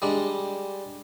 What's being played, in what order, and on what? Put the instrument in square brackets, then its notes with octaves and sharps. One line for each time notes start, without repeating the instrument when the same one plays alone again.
[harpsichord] G3 G#3 D4